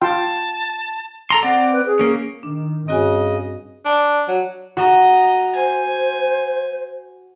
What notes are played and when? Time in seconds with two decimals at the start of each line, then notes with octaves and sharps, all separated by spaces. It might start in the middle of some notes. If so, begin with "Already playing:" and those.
0.01 F4 G5 A5 C6
1.30 A4 A#5 C6
1.43 C4 D5 F#5
1.73 B4
1.87 G#4
1.99 A#3 C#4
2.43 D#3 D4
2.88 G2 C#3 C4 F#4 D#5 G#5
3.85 D4
4.28 F#3
4.77 F#4 D#5 A#5
5.55 C5 G#5